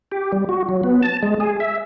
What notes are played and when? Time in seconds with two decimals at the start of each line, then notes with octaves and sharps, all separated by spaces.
0.12 G4
0.32 G3
0.49 F#4
0.69 F#3
0.83 B3
1.03 A5
1.23 G#3
1.40 G#4
1.60 E5